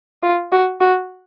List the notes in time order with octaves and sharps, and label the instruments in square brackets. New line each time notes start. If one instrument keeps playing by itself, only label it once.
[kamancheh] F4
F#4
F#4